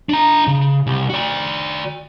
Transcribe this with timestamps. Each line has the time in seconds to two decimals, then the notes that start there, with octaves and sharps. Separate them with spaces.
0.09 D4 A#5
0.47 C#3
0.87 C2
1.10 F#4 D5